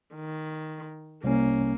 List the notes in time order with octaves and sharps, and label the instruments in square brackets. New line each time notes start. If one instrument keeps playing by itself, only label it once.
[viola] D#3
[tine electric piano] C2 C#4 [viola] A#3